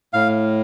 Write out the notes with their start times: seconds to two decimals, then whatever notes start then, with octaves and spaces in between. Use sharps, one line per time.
0.13 A2 F5